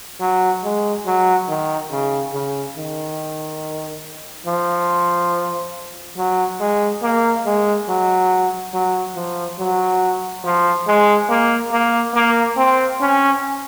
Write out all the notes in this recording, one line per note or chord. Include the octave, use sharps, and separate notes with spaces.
F#3
G#3
F#3
D#3
C#3
C#3
D#3
F3
F#3
G#3
A#3
G#3
F#3
F#3
F3
F#3
F3
G#3
A#3
A#3
A#3
C4
C#4